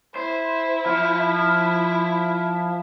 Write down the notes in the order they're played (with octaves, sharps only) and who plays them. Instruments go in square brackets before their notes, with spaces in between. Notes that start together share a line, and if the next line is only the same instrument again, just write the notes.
[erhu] E4 [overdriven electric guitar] C5
[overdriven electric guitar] F3